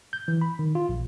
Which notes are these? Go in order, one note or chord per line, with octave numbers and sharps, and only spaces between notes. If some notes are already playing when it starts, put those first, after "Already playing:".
G6
E3
B5
D#3
F4
A#1